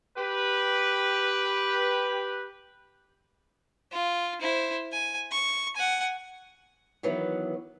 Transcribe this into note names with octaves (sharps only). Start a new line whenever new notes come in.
G4 B4
F4
E4 C5
G#5
C#6
F#5 G#5
D#3 E3 F#3 B3